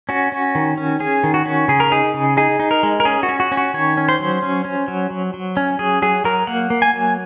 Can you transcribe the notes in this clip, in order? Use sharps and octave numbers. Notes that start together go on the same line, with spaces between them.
C#4 F#4
C#4
D#3
C#4
C#4 G#4
D#3
F#4
C#4
C#3 G#4
A#4
D#4 G#4
C#3
D#4 G#4
D#4
A#4
G#3
A#4
C#4 G#4
F#4
C#4
F#4
C#4
F#4
D#3 C#5
C#4
C5
F#3
C#4
C#4
F#3
F#3
F#3
C#4
F#3 G#4
F#3 G#4
F#3 A#4
A#3 F#5
A#3
G#5
F#3